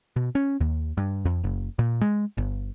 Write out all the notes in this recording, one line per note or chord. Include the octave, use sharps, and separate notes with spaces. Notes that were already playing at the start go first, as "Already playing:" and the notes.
B2
C#4
D#2
G2
F2
F#1
A#2
G#3
G1